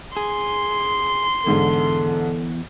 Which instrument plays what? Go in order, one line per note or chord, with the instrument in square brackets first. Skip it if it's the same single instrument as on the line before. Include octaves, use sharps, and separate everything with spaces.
[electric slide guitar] G#4 [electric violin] C6
[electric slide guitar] E2 [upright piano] G#2 D3 G#3 [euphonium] A4